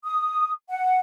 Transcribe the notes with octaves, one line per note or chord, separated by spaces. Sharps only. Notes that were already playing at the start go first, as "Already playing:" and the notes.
D#6
F#5